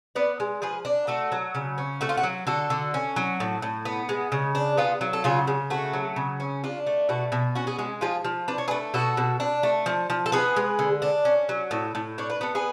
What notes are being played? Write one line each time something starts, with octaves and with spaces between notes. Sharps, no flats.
B3 B4 D5
G#3
F3 G#4 B4
D4
A3 F#4 A4
F#3
C#3
C#4
A3 F#4
F4
F#4
F#3
D3 F#4 A4
D3
C#4
F#3
A2
A2
B3
G#3
C#3
D4
B3 F4 G#4
F#3
A4
C#3 F4 G#4
C#3
A3 F#4
F#3
C#3
C#4
D4 F4
A3
B2 F#4
B2
C#4 F#4
G#4
G#3 F#4
F3 F4 G#4
F3
D4 B4
C#5
G#4 B4
A3
B2 F#4 A4
B2
D4
A3
F3
F3
A4
B3 G#4 B4
G#3
D3
D4
C#4
F#3
A2
A2
D4 C#5
B4
B3 A4
G#4 B4